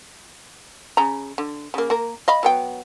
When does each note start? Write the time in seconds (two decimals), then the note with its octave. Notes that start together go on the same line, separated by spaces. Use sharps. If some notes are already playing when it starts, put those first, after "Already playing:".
0.97 C#3 A#5
1.38 D3
1.74 C#3 A#3
1.90 A#3 A#4
2.28 D#5 F5 B5
2.43 F#3 B3 G5